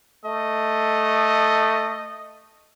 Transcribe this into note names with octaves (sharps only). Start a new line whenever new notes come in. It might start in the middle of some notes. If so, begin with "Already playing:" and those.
A3 D#5